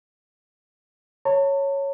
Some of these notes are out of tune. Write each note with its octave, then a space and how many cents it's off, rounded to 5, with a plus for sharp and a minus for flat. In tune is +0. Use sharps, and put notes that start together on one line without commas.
C#5 +0 A5 +45